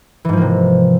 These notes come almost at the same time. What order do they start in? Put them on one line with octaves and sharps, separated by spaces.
E3 G#2 F3 A#3 C3